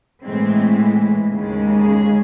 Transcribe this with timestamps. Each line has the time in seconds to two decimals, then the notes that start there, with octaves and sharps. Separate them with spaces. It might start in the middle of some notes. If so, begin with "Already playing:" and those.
0.25 A2 E3 G#3 C4
1.30 D#2 C#3 G#3
1.84 G#4